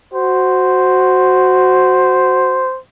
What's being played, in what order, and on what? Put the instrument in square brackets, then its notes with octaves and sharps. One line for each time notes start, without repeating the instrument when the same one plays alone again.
[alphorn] F#4 [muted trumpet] C5